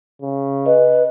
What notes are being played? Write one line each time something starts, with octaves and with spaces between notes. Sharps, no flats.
C#3
B4 D#5